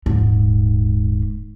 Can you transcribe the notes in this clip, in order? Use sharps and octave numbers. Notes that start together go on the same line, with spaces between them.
D#1 G#2